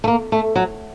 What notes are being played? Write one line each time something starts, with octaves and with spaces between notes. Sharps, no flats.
A3
A#3
A3
F#3